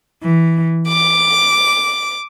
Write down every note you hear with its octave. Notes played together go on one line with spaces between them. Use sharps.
E3
D6